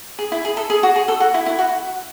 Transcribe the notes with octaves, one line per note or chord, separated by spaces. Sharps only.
G#4
E4
G#4
A4
G#4
F#4
G#4
A4
F#4
E4
E4
F#4